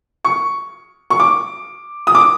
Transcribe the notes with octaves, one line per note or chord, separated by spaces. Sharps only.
C#6
C#6
D6
D#6
D6